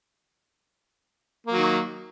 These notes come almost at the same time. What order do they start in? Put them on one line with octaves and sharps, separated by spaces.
A#3 F#3 D#3